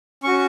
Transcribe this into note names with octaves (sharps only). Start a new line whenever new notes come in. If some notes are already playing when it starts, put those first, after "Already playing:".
C#4 F#4 C#6